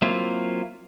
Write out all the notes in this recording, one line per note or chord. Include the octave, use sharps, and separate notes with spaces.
F#3 A#3 C4 E4 F4